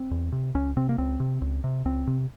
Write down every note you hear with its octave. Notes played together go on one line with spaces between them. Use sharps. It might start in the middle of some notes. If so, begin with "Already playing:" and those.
Already playing: C4
E2
C3
C#2 C#4
C3 C4
A#3
C#2 C4
C3
C#2
C3
C#2 C4
C3